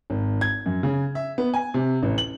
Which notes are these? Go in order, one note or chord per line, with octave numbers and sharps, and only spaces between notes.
G#1
G#6
F#2
C#3
E5
B3
G#5
C3
A1
F#7